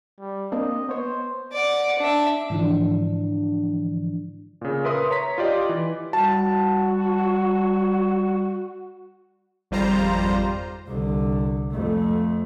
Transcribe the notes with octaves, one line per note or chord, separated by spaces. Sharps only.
G3
A#3 C4 D4 D#5
B3 C5 C#5
D5 F#5
D4 E5
G#2 D3 E3 F3 D4
A#2 C#3
A#4 B4 E5 C6 D#6
C#5 A#5 B6
F4 G4 D5 D#5
E3
G3 F#4 A5
G#1 F2 G3 F4 C5 A#5
C2 D3
F2 A3